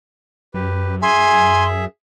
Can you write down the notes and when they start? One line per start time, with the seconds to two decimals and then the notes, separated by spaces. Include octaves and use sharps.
0.54 F#2 G4 B4
1.02 G#4 E5 G#5 C6